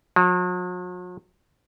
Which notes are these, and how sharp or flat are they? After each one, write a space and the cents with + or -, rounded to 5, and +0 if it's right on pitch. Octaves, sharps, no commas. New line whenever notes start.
F#3 -45